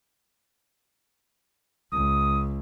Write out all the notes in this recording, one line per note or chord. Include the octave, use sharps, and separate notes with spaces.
C#2 D#6